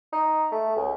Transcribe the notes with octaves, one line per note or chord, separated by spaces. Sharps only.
D#4
A3
C#2